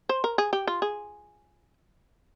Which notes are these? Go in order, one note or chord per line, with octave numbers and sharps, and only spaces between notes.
C5
A#4
G#4
G4
F4
G#4